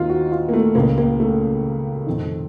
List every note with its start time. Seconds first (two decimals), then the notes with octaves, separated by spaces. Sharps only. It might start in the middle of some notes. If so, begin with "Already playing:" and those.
Already playing: D#2 D#3 A#3 C4 D#4 F4
0.09 F#4
0.32 F4
0.49 A#3
0.53 A3
0.75 C#2 C#3 A#3
0.98 A#3
1.20 A3
2.07 F1 F2 D#3